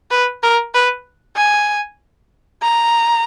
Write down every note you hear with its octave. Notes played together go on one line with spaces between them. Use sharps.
B4
A#4
B4
G#5
A#5